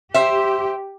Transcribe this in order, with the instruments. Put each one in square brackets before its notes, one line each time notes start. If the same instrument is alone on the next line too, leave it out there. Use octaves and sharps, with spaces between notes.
[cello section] G4 [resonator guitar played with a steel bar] C5 E5